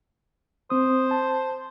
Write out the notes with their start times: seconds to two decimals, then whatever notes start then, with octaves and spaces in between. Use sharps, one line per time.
0.70 C4 C5 D#6
1.11 A5